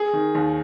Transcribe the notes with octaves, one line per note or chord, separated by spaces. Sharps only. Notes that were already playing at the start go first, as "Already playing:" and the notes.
Already playing: G#4
D#3
D#2